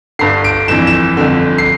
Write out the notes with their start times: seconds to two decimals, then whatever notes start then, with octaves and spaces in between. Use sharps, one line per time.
0.19 G1 G2 D3 C7
0.44 D7
0.68 G1 F2 E3 E7
0.87 E7
1.17 G1 F2 D3
1.58 C7